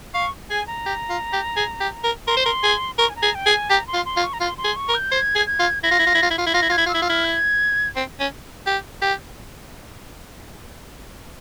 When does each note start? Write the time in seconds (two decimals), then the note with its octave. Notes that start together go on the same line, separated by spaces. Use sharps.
0.14 F5 C#6
0.49 G#4 G#5
0.67 A#5
0.86 G4
1.09 F4
1.33 G4
1.56 G#4
1.80 G4
2.04 A#4
2.27 A#4 C6
2.37 C5
2.45 A#4
2.63 G#4
2.98 A#4 C#6
3.09 G#5
3.16 A#5
3.22 G#4
3.35 G5
3.46 G#4
3.52 G#5
3.70 G4 A#5
3.87 C6
3.93 F4
4.05 C6
4.17 F4
4.23 C#6
4.33 A#5
4.40 F4 C6
4.58 C6
4.64 G#4
4.76 C#6
4.88 A#4
4.94 G6
5.11 C5 G#6
5.35 G#4
5.47 G#6
5.59 F4
5.83 E4 A#6
5.91 F4
5.99 E4
6.06 F4
6.14 E4
6.22 F4
6.30 E4
6.38 F4
6.46 E4
6.54 F4 A#6
6.62 E4
6.69 F4 G#6
6.78 E4
6.86 F4 E6
6.94 E4
7.02 F4
7.08 E4 F6
7.25 G#6
7.96 C4
8.20 C#4
8.66 G4
9.02 G4